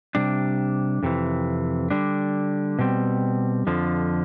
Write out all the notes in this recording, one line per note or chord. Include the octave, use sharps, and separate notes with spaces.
C3 G3 D4
F2 C3 E3
D3 G3 D4
B2 G3 C4
F2 D3 F3